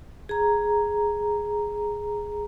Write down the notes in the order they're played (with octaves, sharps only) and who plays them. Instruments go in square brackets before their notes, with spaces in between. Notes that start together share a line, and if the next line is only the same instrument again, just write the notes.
[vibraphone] G#4 A#5